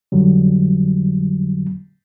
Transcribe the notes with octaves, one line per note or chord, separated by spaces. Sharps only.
F2 D3 F#3 G3